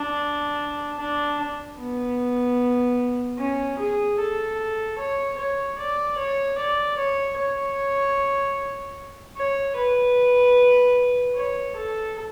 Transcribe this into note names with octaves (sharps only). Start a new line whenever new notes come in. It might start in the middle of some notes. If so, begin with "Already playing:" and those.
Already playing: D4
D4
B3
C#4
G#4
A4
C#5
C#5
D5
C#5
D5
C#5
C#5
C#5
B4
C#5
A4